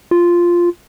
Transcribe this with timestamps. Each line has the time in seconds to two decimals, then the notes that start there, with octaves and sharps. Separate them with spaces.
0.11 F4